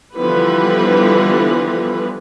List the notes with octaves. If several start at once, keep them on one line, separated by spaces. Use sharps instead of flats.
D3 E3 F3 G3 B3 B4